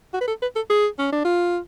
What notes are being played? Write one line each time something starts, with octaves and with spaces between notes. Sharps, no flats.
F#4
B4
A4
B4
A4
G#4
C#4
D4
F4